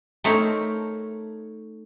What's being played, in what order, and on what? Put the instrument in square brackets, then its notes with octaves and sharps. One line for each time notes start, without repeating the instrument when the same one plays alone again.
[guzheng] A3 C4 D#4 A#4 C5 C#5